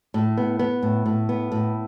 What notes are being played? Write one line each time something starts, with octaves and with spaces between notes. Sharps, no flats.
A2
B3
B3
A2
A2
B3
A2